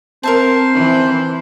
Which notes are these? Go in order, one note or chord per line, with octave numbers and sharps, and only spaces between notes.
C4 A#4 C5 E5 A5
E3